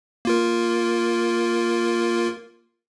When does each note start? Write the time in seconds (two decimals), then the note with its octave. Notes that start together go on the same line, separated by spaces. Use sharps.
0.25 A#3 F4 A#4